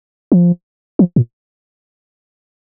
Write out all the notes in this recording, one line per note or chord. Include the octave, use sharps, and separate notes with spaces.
F3
F3
A#2